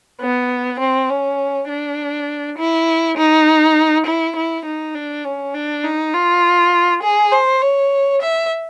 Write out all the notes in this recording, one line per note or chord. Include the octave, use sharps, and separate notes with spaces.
B3
C4
C#4
D4
E4
D#4
E4
E4
D#4
D4
C#4
D4
D#4
F4
G#4
C5
C#5
E5